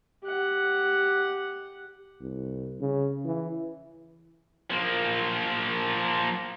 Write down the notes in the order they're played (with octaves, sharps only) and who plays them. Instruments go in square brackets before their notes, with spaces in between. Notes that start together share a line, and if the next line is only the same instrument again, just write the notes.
[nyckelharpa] G4 F#5
[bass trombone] C2
C#3
E3
[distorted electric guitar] F3 A#3